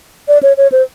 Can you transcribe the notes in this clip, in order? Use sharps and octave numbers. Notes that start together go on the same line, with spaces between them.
D5
C#5
C#5
C5